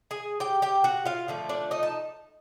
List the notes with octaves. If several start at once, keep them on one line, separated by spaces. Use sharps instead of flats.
G#4 G#5
G4 G5
G4 G5
F#4 F#5
F4 F5
D3 F3 A3
D4 D5
D#4 D#5
A5